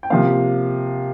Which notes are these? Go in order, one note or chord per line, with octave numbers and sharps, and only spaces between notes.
G5
C3 F3 A#3 F5